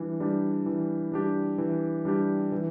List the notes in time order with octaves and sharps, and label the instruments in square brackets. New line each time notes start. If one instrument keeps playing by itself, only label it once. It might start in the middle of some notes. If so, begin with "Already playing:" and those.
Already playing: [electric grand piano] E3 G3 D4
G3 D4 G4
E3
G3 D4 G4
E3
G3 D4 G4
E3